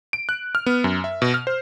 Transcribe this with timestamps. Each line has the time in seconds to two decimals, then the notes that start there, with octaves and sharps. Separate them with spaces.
0.13 D7
0.29 F#6
0.55 F6
0.66 B3
0.84 F#2
1.04 E5
1.22 B2
1.34 F6
1.47 C5